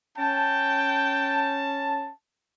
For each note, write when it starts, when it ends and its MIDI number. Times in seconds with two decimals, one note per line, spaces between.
0.18 2.11 61
0.18 1.63 79
0.18 2.11 81